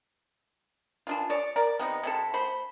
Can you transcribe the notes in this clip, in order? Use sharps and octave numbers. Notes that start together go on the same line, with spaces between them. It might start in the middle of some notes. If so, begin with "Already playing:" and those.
E3 D4 F4
C#5 D5
A#4 D5
C3 B3 D#4
C3 E4 A4
A3 C5 B5